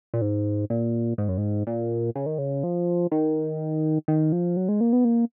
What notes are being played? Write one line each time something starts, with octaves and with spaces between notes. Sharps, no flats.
A#2
G#2
A#2
G#2
F#2
G#2
A#2
C#3
D#3
C#3
F3
D#3
D#3
F3
F#3
G#3
A#3
B3
A#3